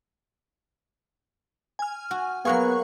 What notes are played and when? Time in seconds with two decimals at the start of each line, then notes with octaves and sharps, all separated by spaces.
1.79 G#5 F6
2.11 F#4
2.45 F#3 A#3 B3 G#4 F5 C#6 F#6